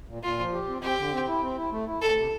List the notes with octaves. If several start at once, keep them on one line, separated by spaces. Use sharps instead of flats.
A#2
A#2 F4
F3
G4
C4
C4 G4
D3
C4
E4
C4
E4
A3
E4
D2 A4
C3